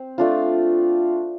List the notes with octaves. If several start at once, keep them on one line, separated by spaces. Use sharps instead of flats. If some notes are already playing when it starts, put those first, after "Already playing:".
Already playing: C4
A3 D4 F4